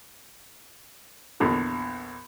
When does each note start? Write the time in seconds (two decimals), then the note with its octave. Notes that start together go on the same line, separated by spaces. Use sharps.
1.40 A#1 E2 D3